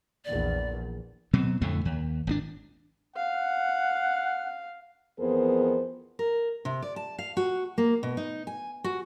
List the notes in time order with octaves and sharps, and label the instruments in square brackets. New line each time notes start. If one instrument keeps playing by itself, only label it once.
[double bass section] A#1 E2 A#2 [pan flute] D5
[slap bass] B2 F#3 C4
F2 A2 D3 A3
D#2
G#1 D#3 D4
[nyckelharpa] F5 [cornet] F#5
[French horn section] F2 E3 B3 G#4 A#4 C5
[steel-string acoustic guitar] A#4
C3
D5
A5
F5
F#4
A#3
B2
D#4
G#5
F#4